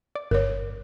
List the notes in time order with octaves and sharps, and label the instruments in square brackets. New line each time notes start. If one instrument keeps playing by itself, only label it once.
[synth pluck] D5
[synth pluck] G1 [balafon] A#4 C#5